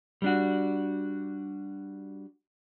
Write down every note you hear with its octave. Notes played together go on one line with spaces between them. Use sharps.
G3 D4 F#4